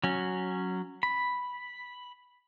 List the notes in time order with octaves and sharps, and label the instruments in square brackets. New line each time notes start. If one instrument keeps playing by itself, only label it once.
[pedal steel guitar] F#3 C#4
B5